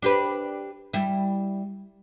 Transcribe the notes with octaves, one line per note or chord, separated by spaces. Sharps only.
D4 G4 B4
G3 E4